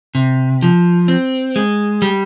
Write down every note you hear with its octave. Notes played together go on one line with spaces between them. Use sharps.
C3
F3
C4
G#3
G3